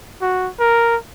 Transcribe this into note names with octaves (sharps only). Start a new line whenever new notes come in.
F#4
A#4